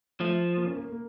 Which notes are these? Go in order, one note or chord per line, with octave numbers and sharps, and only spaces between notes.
F3 A3
A#3
C#4
A#3
A#3